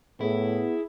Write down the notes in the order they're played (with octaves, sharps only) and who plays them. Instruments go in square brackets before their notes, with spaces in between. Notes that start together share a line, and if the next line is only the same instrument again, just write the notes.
[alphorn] A2 [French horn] B3 [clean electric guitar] E4 [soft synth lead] G#4